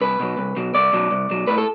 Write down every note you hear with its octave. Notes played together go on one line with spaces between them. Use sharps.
C2 B4
B2 F#3
C2
B2 F#3
C2 D5
B2 F#3
C2
B2 F#3
A2 B4
A4